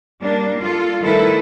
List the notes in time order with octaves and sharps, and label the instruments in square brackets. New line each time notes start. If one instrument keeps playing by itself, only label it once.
[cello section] G3 A#3 D4
F4 A4
D#3 G3 A3 E4 A4 B4